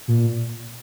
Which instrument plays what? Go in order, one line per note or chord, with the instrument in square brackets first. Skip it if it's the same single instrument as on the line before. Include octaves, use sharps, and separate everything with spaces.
[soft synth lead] A#2